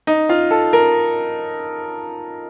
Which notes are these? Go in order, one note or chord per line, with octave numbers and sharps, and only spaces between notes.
D#4
F4
A4
A#4